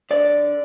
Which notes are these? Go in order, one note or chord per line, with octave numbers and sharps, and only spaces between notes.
D3 D5